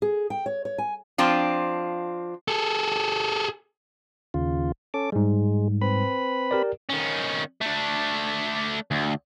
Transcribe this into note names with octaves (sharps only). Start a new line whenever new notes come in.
G#4
G5
C#5
C#5
G#5
F3 C4 D4 F4
G#4 A4
D#2 C#3 F4
C#4 A4 D6
G#2 G3 G#3
C4 B4 B5
G4 A#4 D5
D#3 C#4
A3 D4
D2